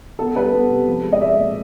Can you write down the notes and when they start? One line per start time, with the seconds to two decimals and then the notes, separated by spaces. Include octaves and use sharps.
0.19 B3 A4
0.35 G3 A4 B4
0.53 B3
0.70 C3
0.88 F3
1.04 G#3
1.12 D#5
1.21 G#3 D5 E5
1.38 A#2